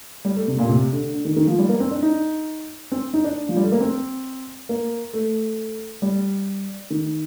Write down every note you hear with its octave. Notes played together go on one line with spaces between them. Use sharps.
G3
A3
C3
A#2
C3
D3
D3
D#3
D#3
F3
G3
A#3
C4
D4
D#4
C4
D#4
D4
F3
G3
A3
A#3
C4
A#3
A3
G3
D#3